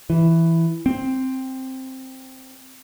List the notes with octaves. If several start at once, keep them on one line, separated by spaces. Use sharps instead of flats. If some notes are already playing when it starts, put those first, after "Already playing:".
E3
C4